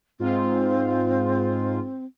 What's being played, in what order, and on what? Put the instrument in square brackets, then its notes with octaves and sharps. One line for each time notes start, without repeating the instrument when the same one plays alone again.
[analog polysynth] G#2 F4 [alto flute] C4